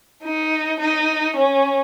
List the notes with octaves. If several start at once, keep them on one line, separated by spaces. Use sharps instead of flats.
D#4
D#4
C#4